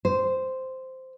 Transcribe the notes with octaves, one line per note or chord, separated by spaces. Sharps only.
C5